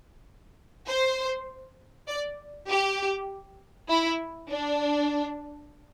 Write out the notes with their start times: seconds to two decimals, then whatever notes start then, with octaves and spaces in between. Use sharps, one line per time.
0.87 C5
2.08 D5
2.69 G4
3.89 E4
4.50 D4